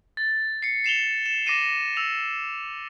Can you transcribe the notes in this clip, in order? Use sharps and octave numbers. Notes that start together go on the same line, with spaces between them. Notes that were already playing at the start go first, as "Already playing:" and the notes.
A6
C7 C#7
C7 E7 F7 G7
E7
D6 A#6 C7 D#7 E7
E6 F7